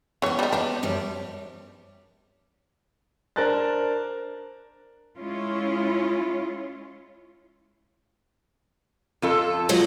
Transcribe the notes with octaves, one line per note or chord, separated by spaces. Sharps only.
E3 B3 C#4 C#5
G3 D#4
B3 D4 D#4
F#2 F3 G3
D4 A#4 C5 A5 F#6 A6
G#3 C#4 E4 F4 C#5
F2 F4 A4
F3 F#3 G#3